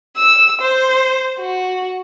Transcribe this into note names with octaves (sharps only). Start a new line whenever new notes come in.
E6
C5
F#4